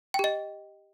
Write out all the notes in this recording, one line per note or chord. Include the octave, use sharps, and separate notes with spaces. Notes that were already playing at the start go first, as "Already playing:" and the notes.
G4 D#5 G5